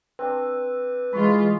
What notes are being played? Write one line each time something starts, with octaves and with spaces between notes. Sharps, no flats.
C4 D4 B4
E3 G#3 F4 B5 C#6 D6